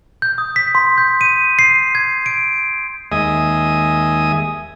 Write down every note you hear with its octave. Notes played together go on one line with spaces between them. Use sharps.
G6
D#6
B6
C6
G6
D#7
C7
G#6
D7
D#2 G#3 D#5 E5 G#5 D#6